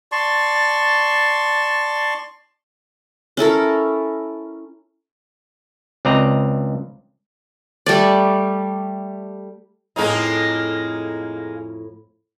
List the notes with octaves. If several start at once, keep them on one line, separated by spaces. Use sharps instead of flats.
D5 A5 C6 C#6
C#4 E4 A4 A#4
C#2 C4 D5 D#5 A#5
G3 A3 D5
F2 A2 G#3 A#3 D#4